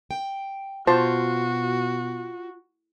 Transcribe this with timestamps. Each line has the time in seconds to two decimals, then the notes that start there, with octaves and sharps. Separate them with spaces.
0.11 G5
0.87 B2 F4 F#4 C5 A5